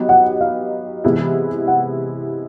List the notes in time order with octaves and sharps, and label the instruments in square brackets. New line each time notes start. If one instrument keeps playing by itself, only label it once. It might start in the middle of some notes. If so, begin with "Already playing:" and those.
Already playing: [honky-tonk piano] F#3 B3 D#4 G4
[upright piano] F#5
F5
[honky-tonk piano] C3 E3 G#3 B3 E4
[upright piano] F#5